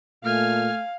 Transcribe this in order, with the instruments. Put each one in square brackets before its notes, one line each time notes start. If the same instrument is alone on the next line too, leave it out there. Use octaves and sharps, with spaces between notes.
[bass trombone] A#2 [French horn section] A3 [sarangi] F5 [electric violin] G#5 F6